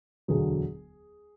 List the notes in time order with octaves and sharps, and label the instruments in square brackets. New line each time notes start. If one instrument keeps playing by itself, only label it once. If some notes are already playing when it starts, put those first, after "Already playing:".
[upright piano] E1 D2 D3 F#3 G#4